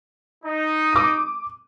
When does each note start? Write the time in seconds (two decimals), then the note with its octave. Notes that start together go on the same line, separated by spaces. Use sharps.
0.44 D#4
0.93 D6 D#7